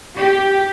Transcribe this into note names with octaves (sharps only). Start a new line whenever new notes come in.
G4